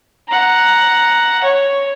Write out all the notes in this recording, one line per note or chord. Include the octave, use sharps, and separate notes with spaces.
F#5 A#5
C#5